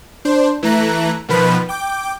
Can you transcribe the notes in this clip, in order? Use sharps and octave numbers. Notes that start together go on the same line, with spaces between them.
D4 C5
E3 A3 A#5 F#6
B2 D#3 F3 B4 B5
G5 D6